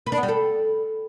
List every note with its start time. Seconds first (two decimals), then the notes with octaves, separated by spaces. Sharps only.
0.06 B4
0.12 D4
0.17 B3
0.23 G3
0.28 A4